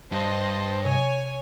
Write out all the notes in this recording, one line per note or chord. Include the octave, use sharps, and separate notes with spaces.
G2 C5 D#5 A5
C3 C#5 G#5